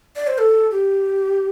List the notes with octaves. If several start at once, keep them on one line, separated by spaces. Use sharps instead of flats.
D5
C5
A4
G4